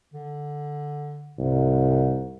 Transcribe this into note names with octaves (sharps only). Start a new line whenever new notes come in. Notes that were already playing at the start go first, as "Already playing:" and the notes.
D3
C2 G#2